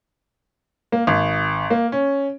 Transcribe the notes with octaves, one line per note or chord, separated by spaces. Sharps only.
A#3
G#1
A#3
C#4